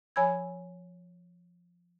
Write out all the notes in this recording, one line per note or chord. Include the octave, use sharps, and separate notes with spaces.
F3 C#5 G#5 B5 E6 G#6